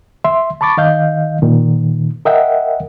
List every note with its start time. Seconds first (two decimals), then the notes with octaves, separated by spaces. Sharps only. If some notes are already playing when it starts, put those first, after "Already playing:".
0.25 E5 C6
0.61 A5 B5 C#6 D6 A6
0.77 D#3 D#5 F5 G6
1.42 A#2 D#3
2.25 A#4 D#5 E5 F#5 G5